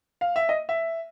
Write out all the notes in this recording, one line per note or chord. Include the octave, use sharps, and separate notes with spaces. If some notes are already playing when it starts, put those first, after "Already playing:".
F5
E5
D#5
E5